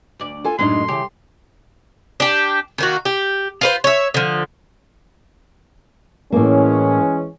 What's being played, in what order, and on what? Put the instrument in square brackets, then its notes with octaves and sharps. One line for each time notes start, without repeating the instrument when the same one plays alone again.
[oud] D2 D5
[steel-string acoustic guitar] F4 A4 G#5
[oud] F#2 A2 [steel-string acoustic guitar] G#3 D4 D#4 [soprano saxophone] C6
[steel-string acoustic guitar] C#3 E3 [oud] G4
[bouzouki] D4 G4
D#3 A#3 F#4
G4
F4 B4 C5
C#5 E5
D3 F3
[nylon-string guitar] A2 A#3 [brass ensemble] E3 G#3 C#4